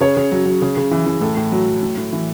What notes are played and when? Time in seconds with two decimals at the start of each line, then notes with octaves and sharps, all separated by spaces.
0.01 C#3 C#5
0.17 C#3
0.32 F#3
0.46 F#3
0.62 C#3
0.77 C#3
0.91 E3
1.06 E3
1.21 A2 A4
1.37 A2
1.52 F#3
1.66 F#3
1.83 A2
1.97 A2
2.13 E3